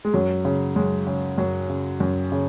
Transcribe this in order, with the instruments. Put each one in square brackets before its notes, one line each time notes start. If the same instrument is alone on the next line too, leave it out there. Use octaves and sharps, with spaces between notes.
[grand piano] G#3
F#2 F#3
C#3
F#2 G#3
C#3
F#2 F#3
C#3
F#2
C#3